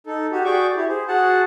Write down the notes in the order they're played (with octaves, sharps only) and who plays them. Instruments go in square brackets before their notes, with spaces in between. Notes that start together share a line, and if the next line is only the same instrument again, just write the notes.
[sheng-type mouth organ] D#4 A4
F#4 G4
F#4 G#4 D5 G5 C#6 D6
E4 G4
G#4 C5
F#4 G#4 F#5 A5